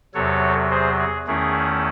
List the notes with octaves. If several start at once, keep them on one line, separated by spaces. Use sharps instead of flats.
E2 C3 F#3 A4 C#5
G#4 C5
G#4
E2 D#3 A3 C#4 E4 G#4